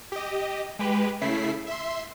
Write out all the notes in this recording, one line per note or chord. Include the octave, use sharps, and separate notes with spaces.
G4 D#5
G#3 G4 B4
C#3 A3 E4 B6 C7
E5 C6